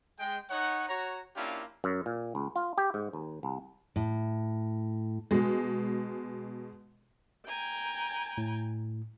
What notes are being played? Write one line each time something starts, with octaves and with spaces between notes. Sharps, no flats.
G#3 G5
D#4 C#5 F#5
F#4 C#5 A#5
A#3 C#4 D4 E4 F4 G4
F#2
A#2
C#2
F4
G4
G#2
D#2
C2
A2
B2 G#3
G5 G#5 A#5
A2